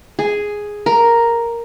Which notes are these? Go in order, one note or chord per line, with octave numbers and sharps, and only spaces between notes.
G#4
A#4